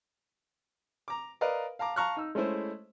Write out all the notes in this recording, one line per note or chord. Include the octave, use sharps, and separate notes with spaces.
A#5 D6
A#4 B4 D5 D#5 F5
F5 A5 A#5 D6
F5 A5 A#5 C#6 F6 F#6
D#4 E6
G#3 A3 C#4 E4 C5